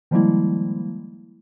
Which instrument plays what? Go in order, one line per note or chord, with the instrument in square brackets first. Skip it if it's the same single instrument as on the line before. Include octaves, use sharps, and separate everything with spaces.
[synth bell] D#3 F3 G3 G#3 A#3 E4